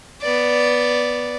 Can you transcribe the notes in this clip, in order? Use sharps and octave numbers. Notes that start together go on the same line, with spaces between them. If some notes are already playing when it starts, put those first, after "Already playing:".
B3 D5